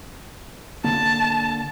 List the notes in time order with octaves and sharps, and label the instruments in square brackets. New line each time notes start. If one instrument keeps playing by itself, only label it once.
[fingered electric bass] D3 A#3 [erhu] A5